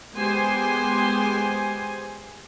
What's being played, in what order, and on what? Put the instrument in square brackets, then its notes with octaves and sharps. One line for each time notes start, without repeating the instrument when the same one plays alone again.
[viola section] G#3 B3 G4 C5 G#5 C6